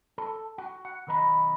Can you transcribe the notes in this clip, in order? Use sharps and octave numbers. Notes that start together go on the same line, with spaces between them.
A4
F#4
F#5
B1 D#3 B4 D#5 A#5 B5